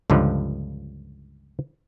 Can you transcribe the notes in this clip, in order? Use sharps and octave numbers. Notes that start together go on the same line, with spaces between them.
C#2 G2 D3 F3